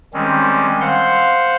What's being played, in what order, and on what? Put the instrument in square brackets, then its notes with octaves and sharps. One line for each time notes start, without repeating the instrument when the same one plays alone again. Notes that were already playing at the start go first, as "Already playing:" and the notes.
[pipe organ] D#3 G3 G#3 C4 C#4
C5 F5 F#5 C6